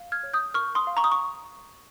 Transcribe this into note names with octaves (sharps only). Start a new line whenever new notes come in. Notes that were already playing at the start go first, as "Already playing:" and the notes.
Already playing: F5
F6 G#6
C#5
D#6 G6
A#4 C#6 F6
C6 D#6
F5
A#5 C#6
D#6
C#6